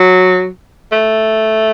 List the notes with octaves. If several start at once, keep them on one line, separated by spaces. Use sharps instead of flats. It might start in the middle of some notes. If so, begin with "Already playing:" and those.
Already playing: F#3
A3